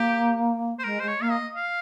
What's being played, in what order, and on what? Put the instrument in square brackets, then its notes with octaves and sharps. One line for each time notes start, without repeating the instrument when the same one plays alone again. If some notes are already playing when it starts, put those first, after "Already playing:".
Already playing: [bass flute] A#3 [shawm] G4
[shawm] C5
[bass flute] G#3 [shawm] A#4
[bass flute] G#3 [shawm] C5
[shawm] C#5
[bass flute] A#3 [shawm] F5
[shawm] D#5
F5